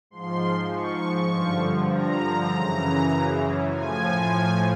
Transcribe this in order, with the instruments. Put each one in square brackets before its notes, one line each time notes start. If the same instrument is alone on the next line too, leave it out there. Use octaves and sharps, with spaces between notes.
[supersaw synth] G#2 F3 C6
C#6
G2 D3 F3
A#5
F#2 C#3 E3
A2 F3 G#5